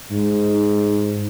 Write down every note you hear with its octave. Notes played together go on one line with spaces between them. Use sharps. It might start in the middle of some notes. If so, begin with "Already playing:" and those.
G#2